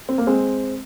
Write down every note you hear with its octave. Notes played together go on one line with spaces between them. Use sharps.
C4
A#3
G#3 C4